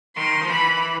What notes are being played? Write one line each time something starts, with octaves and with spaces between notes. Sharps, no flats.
D#3 C6
F3
E3 B5